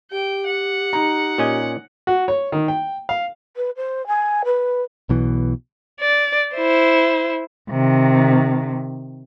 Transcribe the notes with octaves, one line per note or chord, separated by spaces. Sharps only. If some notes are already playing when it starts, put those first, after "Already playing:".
G4 G5
F#5
D#4 A#5
A#2 C#4 D#5
F#4
C#5
D#3
G5
F5
B4
C5
G#5
B4
B1 B2 E3
D5
E4 C5
C3 D#3